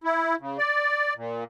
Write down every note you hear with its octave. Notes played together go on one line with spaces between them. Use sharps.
E4
C#3
D5
A#2